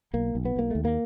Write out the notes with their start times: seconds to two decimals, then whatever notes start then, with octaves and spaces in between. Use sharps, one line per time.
0.13 B1 A#3
0.35 B1
0.45 B3
0.56 B1 A#3
0.71 D#2 A3
0.85 A#3